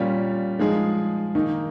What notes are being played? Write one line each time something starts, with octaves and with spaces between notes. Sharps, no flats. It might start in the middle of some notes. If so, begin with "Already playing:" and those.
Already playing: A#2 G3 C#4 F4
F3 G#3 D#4 G#4
D#3 A#3 D#4